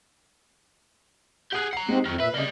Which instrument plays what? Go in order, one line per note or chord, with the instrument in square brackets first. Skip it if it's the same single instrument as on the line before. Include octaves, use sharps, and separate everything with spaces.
[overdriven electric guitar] G4 G#4 [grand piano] F#5 D#6 F#6
[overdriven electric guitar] F#5 A#5 [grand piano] C7
[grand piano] G#3 D#4 G4 [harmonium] C4
[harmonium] F2 [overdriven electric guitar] D#3 F#3 [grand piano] F6
[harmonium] A#2 E5 [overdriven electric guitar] B4 [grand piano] B6
[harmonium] C#3 [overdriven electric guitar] G3 A#3 [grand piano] D5 D#5